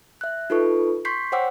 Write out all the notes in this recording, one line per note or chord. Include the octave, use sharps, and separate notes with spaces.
E5 F#6
D#4 F4 A4 B4 C#6
C6 C#6 G6 B6 C7
C5 C#5 F#5 G5 D6 E6